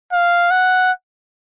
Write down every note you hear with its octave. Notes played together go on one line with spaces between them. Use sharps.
F5
F#5